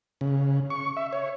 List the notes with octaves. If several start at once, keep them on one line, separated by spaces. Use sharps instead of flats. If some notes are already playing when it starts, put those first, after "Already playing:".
C#3
C#6
E5
C#5